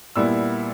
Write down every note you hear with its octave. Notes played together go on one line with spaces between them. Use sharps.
A#2 G3 B3 E4 E6